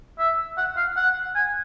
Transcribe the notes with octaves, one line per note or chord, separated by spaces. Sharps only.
E5
F#5
F5
F#5
G#5